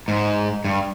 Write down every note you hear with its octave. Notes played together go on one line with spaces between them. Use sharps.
G#2
G2